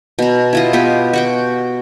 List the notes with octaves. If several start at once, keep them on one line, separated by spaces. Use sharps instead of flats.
B2 A#5
E4 F4 D#5
B3 F4 G4
F#4 F#5 G5